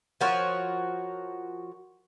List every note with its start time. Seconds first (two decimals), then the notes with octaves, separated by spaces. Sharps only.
0.21 F3 F#4 A#4 C#5